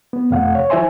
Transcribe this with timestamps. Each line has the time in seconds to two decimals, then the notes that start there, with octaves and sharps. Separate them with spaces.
0.13 B3
0.31 F2 C3 A3 F5 F#5
0.55 C#5
0.70 F3 E4 C5 E5 G#5 C6